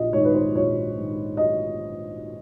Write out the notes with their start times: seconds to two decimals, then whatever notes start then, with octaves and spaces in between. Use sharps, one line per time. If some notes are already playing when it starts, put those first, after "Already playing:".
Already playing: A#1 D#5
0.13 G#2 D#3 C#5
0.25 B4
0.34 C5
0.55 A#1 C#5
0.97 G#2 D#3
1.37 D#5